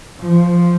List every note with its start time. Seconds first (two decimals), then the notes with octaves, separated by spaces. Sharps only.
0.21 F3